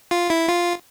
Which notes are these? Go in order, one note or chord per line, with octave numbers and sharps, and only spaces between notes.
F4
E4
F4